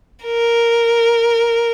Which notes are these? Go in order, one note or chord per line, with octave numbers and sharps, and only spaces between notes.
A#4